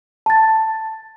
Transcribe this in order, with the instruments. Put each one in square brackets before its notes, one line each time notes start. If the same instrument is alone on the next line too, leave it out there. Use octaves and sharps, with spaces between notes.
[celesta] A5 A6